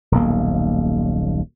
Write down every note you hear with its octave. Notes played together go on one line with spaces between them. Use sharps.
D#1 B1 A#3